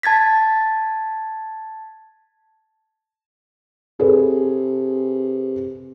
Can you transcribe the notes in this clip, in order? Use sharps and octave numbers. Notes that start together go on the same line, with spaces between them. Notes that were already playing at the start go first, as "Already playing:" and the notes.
A5 G#6 A6 B6
C3 G#4 A4 B4